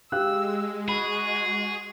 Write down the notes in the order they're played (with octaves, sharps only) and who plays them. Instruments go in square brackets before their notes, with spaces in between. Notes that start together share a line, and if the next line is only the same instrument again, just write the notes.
[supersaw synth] G#3 [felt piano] G4 F5 F#6 [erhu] E6
[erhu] F#4 [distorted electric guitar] G#4 [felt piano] B5